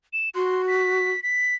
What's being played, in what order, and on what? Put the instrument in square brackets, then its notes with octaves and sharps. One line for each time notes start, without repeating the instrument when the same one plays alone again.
[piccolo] E7
[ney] F#4 [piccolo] C6
[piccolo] B6
B6